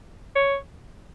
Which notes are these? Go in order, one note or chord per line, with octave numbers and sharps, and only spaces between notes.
C#5